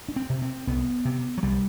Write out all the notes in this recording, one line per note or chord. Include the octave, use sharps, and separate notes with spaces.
D4
C4
C3
C4
C2 B3
C3
F#3
C2 G3